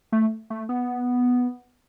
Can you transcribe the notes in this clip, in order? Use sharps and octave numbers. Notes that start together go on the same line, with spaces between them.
A3
A3
B3